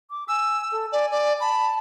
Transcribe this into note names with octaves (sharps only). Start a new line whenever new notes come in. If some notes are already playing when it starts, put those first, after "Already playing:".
D6
G#5 E6
A4
D5 G#5
D5
A5 B5